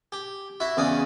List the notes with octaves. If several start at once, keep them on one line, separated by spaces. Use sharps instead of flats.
G4
E4 F#4 E5
E2 C#3 F#4 D5 D#6